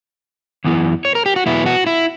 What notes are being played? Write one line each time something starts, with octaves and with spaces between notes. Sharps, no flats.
F#2 E3 B3 E4
C#5
A#4
G4
F#4
E2 B2 F#3 B3 E4
F#4
E4